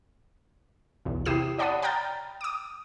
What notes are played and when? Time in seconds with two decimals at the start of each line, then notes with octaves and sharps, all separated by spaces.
1.05 B1 E2
1.26 C3 E4 G4 D#6 C7 E7
1.58 C#5 D5 F#5 A5 B5 D#6
1.82 G5 A#5 B5 F6 G6 A6
2.41 D6 D#6